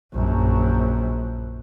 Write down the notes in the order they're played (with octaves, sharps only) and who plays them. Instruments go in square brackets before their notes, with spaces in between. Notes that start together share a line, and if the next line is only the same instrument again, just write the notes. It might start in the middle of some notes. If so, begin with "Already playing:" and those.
[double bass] A#1 F#2